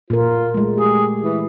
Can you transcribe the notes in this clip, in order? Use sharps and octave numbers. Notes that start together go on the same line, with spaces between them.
A#2 F4 A#4
G#3 A3
G4 G#4
E3